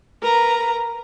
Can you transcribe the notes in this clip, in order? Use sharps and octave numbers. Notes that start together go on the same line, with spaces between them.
A#4 B4 A#5